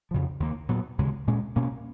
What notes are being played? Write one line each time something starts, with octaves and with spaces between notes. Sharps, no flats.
F2 C#3 F3
D#2 D#3 A#3
A#2 F#3 B3
D#2 C#3 G#3
A#2 G#3 C#4
B2 A#3 C#4